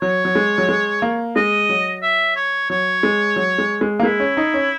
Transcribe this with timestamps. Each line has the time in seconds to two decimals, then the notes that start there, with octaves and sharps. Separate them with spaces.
0.02 F#3 C#5
0.25 F#3
0.36 G#3
0.58 F#3
0.69 G#3
1.02 A#3
1.36 G#3 D#5
1.69 F#3
2.02 E5
2.36 C#5
2.70 F#3 C#5
3.03 G#3
3.36 F#3
3.58 G#3
3.81 G#3
3.99 A#3
4.03 G#3 E4
4.20 C#4
4.37 D#4
4.54 C#4